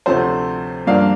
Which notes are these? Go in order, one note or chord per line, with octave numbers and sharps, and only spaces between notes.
D2 C3 F3 A3 C5
G2 F3 A#3 D4 F5